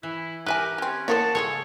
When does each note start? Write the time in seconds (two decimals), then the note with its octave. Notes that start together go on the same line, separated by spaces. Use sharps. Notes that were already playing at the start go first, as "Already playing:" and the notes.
0.03 E3 E4
0.46 E4 G4 A#4 B4 E5 G#5
0.78 C4 C#4 G4
1.08 E3 F3 A#3 C#5 F#5 A5
1.35 C#3 F3 G#3 G#4 A4 C#5